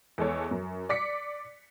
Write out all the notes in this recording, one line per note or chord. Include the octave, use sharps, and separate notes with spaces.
E2 G#3 A4 C#5
F#2
D5 D6 B6 C#7